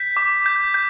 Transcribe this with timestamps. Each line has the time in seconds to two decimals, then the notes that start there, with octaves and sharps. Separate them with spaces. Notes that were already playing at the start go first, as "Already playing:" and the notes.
Already playing: G6 B6
0.17 D6
0.46 G6
0.74 G6